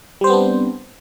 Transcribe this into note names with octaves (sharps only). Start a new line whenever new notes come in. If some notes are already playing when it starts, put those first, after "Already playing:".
G3 B3 C4 D4 C5